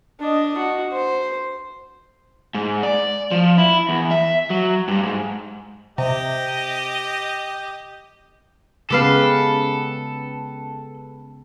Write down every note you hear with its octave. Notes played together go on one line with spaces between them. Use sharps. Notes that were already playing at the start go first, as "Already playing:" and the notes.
D4 D#5
F#4
C5
G#2
D5
F3
E4
E2
E5
F#3
G2
G#2
C3 G4 D#5
C#3 G#3 B3 G4 A4 B4 F5